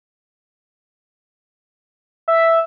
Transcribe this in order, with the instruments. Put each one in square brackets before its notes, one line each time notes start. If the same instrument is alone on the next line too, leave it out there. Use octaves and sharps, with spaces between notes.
[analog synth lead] E5